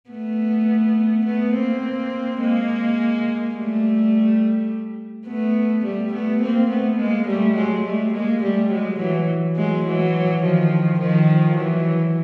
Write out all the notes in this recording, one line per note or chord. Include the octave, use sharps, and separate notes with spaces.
A3 B3
A3 B3
A#3 C4
G#3 A#3
G3 A3
A3 B3
G3 A3
A3 B3
A#3 C4
A3 B3
G#3 A#3
G3 A3
F#3 G#3
G3 A3
G#3 A#3
G3 A3
F#3 G#3
E3 F#3
F#3 G#3
E3 F#3
D#3 F3
D#3 F3
E3 F#3